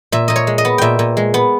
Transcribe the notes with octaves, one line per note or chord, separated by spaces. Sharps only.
A#2 E5
A#2 D#5
C#5
G#3
D#5
B3
A#2 E5 G5
A#2
G#3
B3